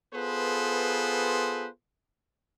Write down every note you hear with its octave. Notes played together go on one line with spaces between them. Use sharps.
B3 F4 G#4 A4 B4 C5